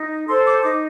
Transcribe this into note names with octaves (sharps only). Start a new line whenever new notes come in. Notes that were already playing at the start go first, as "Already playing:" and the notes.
Already playing: D#4
A4 C5 C6
D6
D#4 D6